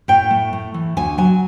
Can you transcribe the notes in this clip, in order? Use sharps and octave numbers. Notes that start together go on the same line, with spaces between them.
A2 G5
A3
A2
E3
D2 G#5
F#3 G#5